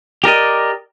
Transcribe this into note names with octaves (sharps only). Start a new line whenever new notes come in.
G4 A#4 D5 D#5